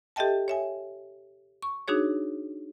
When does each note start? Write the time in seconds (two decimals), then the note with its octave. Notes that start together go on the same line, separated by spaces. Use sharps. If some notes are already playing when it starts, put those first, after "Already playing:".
0.16 G4 A4 D#5 E5 G5 A5
0.48 C#5 E5 G#5
1.62 C#6
1.88 D4 D#4 F#4 G#4 C#5